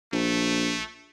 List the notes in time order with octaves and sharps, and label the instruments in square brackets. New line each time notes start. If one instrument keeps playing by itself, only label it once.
[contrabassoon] A#1 [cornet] A3